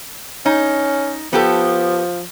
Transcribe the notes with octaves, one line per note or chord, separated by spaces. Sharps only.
C#4 D#4
F3 B3 G4 A4